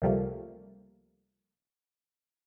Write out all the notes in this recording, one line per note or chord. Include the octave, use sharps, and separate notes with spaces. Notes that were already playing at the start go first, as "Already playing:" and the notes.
C#2 C3 F3 G3 A3 A#3